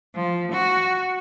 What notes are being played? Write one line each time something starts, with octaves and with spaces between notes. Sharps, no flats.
F3
F#4